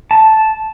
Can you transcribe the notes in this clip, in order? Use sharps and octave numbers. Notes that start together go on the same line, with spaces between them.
A5